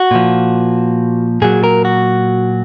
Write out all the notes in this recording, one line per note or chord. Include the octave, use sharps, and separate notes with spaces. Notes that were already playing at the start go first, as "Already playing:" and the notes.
Already playing: F#4
A#2 F3
A#2 F#3 G#4
A#4
F#4